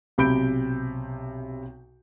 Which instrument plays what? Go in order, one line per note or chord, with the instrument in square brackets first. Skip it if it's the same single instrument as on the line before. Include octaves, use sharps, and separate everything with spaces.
[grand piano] B1 C3 B5 G6 D7